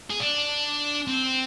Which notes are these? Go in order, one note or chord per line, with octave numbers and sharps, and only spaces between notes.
G#4
D4
C4